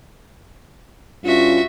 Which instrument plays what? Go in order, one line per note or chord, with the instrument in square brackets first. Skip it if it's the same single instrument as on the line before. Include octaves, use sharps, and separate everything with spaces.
[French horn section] G2 C#4 F4 [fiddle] F#4 E5